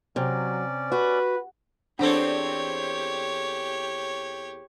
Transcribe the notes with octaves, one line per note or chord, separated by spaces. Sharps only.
C3 F#3 C#4 D5
F#4 B4
E2 C4 D4 G4 A4 C#5 F#5